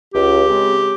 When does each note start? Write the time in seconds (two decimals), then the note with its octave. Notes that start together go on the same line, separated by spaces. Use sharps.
0.13 C#2 G4
0.47 C#3 G#3 C4